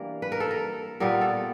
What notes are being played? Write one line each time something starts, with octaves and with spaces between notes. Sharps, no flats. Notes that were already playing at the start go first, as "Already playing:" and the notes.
Already playing: E3 G3 A#3 D4 A#4
B4
A#4
A4
A#4
A#2 G3 B3 A#4
A4